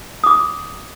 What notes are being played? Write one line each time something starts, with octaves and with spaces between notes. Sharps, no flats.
D6 D#6